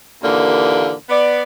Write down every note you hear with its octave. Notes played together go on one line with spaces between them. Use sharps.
D#2 A#2 D3 E3 A#3
B3 D5